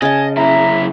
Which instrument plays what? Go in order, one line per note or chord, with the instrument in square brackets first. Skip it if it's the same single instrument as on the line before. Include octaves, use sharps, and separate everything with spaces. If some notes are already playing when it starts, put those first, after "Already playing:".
[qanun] C#3 A5 [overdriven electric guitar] D#5 [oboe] G#5
[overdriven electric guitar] F#2 E4 [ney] E5 [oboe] A#5